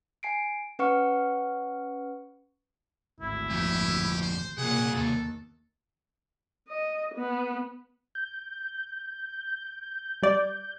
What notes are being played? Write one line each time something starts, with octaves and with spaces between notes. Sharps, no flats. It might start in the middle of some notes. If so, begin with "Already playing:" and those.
G#5 C7 D7
C#4 B4 F#5 C#6 F6 C#7
G#1 D2 E4
F2 A#2 G4
C5
C2 A#2 C#3 A#3 G#4 F#5
D#2 A4
D#5
B3
G6
G3 D5